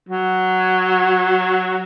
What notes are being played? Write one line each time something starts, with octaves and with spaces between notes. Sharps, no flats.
F#3